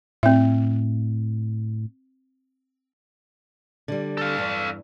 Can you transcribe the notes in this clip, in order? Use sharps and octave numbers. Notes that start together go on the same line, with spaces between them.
A2 C4 E5
D3 G3
A4 F5
E2 G2